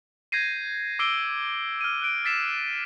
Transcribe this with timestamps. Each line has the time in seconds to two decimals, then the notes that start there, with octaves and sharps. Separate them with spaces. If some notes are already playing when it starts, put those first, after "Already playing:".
0.32 G6 G#6 A#6 C7 D#7
0.99 D6 E6 C7 D7 G7
1.81 F6 D#7
2.02 F#6 D7
2.25 E6 A6 B6 C7 E7